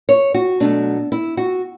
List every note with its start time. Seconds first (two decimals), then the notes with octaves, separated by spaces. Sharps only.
0.09 C#5
0.34 F#4
0.60 B2 F#3 A3 D4
1.12 E4
1.37 F#4